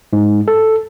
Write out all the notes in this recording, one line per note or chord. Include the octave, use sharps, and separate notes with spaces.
G#2
A4